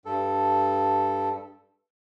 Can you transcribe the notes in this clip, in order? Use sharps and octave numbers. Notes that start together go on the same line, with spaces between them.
G2 A4